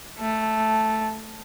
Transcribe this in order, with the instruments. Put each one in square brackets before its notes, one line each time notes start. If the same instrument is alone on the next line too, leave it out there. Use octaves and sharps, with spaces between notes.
[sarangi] A3